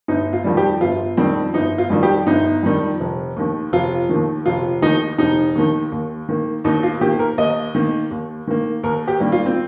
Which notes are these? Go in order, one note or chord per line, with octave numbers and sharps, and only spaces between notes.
G1 D#4
F4
F2 D#3 G3
G4
G1 F4
F2 D#3 G3 C4
G1 D#4
F4
F2 D#3 G3
G4
G1 D#4
F2 D#3 G3
F1
D#2 D#3
F1 F4
D#2 D#3
F1 F4
D#2 D#3 D#4
F1 D#4
D#2 D#3
D#2
D#3 A#3
D#2 D#4
F4
D#3 A#3 G4
A#4
D#2 D#5
D#3 A#3
D#2
D#3 A#3
D#2 A#4
G4
D#3 G3 A#3
F4
C4